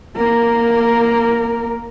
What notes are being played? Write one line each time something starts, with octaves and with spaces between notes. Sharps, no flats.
A#3 A#4